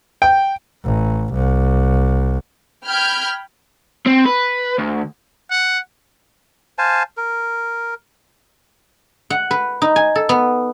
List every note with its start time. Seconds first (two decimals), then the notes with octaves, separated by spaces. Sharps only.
0.22 G5
0.85 A1
1.32 C2
2.86 G5 B5 F6 G6 G#6
4.06 C4
4.25 B4
4.78 D2
5.51 F#5
6.78 C5 F5 G#5 A5
7.17 A#4
9.30 F#5
9.51 B4
9.82 D#4
9.96 G#5
10.15 A4
10.29 B3